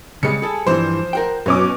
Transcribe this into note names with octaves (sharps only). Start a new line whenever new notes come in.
C#3 G3 G#3 C#7
G#4 A4
G2 E3 F3 G3 C5
A#4 F#5 G5
F#2 B2 C#4 D6